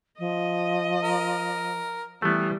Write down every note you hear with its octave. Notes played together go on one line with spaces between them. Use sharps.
F3 D#5
A#4
E3 G3 A3 B3